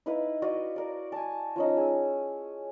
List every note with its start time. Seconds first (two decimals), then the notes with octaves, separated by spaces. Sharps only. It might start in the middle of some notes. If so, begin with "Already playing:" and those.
0.06 D#4 E4 B4 F5
0.42 F#4 D5 D#5 F5
0.76 A#4 D5
1.12 G#5 A5
1.56 F3 C#4 D#4
1.77 G#4 E6